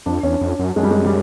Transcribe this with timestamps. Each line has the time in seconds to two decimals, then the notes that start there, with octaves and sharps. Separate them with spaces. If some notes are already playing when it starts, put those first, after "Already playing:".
0.06 F2 D4
0.23 E2 C#4
0.41 F2
0.59 F#2
0.76 F#2 G#3
0.83 G3
0.91 G#3
1.05 G3